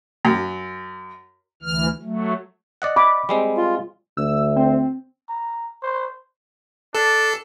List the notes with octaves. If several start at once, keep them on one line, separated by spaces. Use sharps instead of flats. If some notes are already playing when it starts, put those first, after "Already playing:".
F#2
D2 E3 F6
F#3 A3
D5 D#5 F#5
B5 D6
G3 G#3 C4
F4
D2 E6
C4
A#5
C5
D4 A4